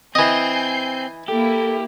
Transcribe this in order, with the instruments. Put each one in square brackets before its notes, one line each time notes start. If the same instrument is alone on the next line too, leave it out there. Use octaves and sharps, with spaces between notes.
[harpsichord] E3 D#5 [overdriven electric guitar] C4 [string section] G#5 G6 C7
[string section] A#3 E4 [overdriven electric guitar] G4 [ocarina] A4